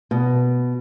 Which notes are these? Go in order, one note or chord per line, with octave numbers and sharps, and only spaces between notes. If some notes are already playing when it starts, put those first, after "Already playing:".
B2